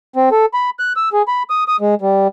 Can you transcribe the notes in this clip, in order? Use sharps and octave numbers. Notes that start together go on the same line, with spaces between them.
C4
A4
B5
F#6
E6
G#4
B5
D#6
D#6
G#3
G3